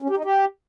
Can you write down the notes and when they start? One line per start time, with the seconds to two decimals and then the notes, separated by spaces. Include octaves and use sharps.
0.02 C#4
0.09 G4
0.17 D#4
0.25 G4